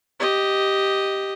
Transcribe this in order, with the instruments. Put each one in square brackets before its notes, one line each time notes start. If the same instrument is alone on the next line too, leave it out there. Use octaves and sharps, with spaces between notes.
[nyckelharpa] G4 D#5